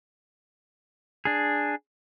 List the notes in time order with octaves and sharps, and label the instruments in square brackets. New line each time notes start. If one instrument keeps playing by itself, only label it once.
[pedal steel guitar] D4 G#4